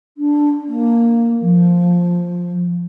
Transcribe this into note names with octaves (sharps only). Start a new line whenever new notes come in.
D4
A#3
F3